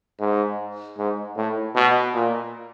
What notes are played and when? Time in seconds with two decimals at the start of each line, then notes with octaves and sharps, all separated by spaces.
0.20 G#2
0.98 G#2
1.36 A2
1.75 B2
2.14 A#2